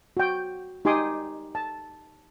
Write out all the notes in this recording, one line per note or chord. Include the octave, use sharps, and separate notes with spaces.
F#4 G5
D#4 G4 G#5 C6 D6 D#6
A5